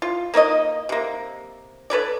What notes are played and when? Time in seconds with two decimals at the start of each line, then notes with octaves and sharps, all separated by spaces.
0.02 F4
0.34 A#3 D#4 C#5 D#5
0.89 C3 A#3
1.90 A4 B4 C#5 D5